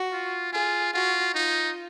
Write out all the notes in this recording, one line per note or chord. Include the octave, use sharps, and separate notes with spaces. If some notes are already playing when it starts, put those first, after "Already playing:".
Already playing: F#4
F4
F4 G#4
F4 F#4
D#4 F4